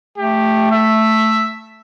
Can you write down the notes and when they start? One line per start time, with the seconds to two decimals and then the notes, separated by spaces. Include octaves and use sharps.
0.18 A3 G4
0.71 E5